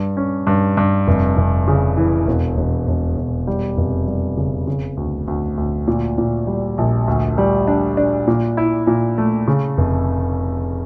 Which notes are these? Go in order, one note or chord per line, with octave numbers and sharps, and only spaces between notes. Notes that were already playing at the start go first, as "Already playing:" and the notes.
Already playing: G2
C#4
G2
G2
F1
F1
C#3
E3
E1
E1
E1
E1
G3
F1
G3
C#3
C#3
D2
D2
D2
A#2
A#2
G3
A#1
D2
G3
D4
D4
A#2
E4
A#2
A3
C#3
F1